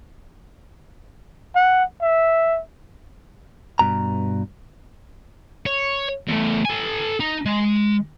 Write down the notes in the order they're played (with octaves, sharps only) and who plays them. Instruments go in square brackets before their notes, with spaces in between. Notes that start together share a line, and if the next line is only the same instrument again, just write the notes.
[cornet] F#5
E5
[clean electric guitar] G2 B2 A#5
[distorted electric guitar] C#5
E2 A3
A4 G#5
D#4
G#3